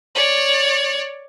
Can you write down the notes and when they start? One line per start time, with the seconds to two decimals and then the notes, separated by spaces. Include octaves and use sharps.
0.15 C#5 D5